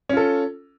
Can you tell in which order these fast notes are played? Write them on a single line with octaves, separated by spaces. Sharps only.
C#4 F4 A4